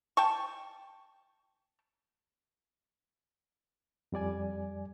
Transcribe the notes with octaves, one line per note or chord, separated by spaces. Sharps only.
G5 A5 C#6
F2 G3 D5 G#5